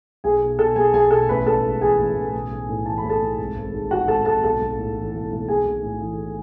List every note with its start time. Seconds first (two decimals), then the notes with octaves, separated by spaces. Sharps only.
0.24 B1 G#4 G#5
0.41 B2
0.59 B2 A4 A5
0.76 B1 G#4 G#5
0.93 B1 G#4 G#5
1.11 B2 A4 A5
1.29 A1 B4 B5
1.46 A1 A4 A5
1.63 G#2
1.81 E3 G#4 G#5
1.99 A1
2.16 A1
2.33 B1
2.51 B1
2.69 A2
2.86 E3 A5
2.98 B5
3.04 B1
3.10 A4 A5
3.22 B1
3.38 G#1
3.56 G#1
3.73 G#2
3.91 D#3 F#4 F#5
4.08 G#1 A4 A5
4.25 G#1 A4 A5
4.43 B1 A4 A5
4.61 B1
4.78 A2
4.96 E3
5.14 B1
5.31 B1
5.48 B1 G#4 G#5
5.65 B1
5.83 A2
6.01 E3